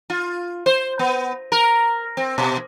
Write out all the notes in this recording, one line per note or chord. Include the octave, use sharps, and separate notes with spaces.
F4
C5
B3
A#4
C4
B2